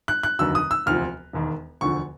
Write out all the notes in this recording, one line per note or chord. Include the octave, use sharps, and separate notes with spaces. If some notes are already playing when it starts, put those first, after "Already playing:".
F#6
F#6
F1 D#2 D3 F#3 E6
D#6
E6
E1 D2 C3 F3 F6
E1 D#2 D#3
E1 D2 D3 F3 C#6